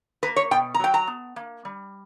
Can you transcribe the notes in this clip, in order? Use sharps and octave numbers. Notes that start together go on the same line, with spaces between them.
A#3 B4
C#5
B2 G5
A#5
F#3 G5
A#5
B3
A#3
G3